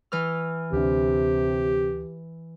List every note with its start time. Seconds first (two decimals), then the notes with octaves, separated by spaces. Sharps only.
0.12 E3 F6
0.73 D2 C3 D4 G4